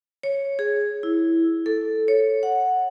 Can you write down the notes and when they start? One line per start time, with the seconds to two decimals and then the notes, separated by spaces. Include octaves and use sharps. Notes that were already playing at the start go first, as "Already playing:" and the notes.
0.23 C#5
0.59 G#4
1.03 E4
1.66 A4
2.08 C#5
2.43 F#5